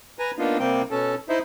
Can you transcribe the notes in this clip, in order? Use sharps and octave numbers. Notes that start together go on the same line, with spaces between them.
B4 G#5 A#5
A#3 B3 D4 D#4 F4
C3 G3 A#3 C4 G5
B2 C#4 A4
D#4 E4 C5 E5